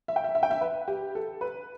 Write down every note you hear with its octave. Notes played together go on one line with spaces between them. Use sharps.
E5
G5
E5
E5
G5
E5
B4
G4
A4
B4